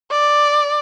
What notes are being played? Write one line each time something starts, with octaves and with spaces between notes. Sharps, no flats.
D5